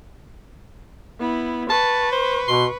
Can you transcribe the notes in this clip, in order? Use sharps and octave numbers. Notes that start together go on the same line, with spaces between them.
B3 E4
B4 A5 C#6
C5
B2 C6